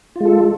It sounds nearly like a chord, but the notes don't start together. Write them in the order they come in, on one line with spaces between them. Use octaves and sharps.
F4 G#3 A4